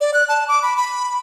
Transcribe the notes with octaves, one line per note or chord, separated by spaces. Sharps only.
D5
F#6
A5
D6
B5
B5